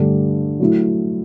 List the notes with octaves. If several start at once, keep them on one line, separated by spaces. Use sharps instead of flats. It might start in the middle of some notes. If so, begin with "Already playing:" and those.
Already playing: G2 D3 A3 D4 G4
F#3 A3 E4